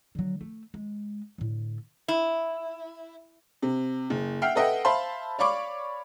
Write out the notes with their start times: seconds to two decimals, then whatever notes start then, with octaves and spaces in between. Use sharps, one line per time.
0.15 D3 F#3
0.41 A3
0.74 G#3
1.38 A2 D3
2.08 E4
3.62 C3
4.10 F#1
4.42 E5 F#5 G5 F6 C7
4.55 A4 B4 D#5 E5 F#5 G5
4.85 C5 E5 F5 A5 B5 C6
5.39 C#5 D5 F5 B5 C#6 D6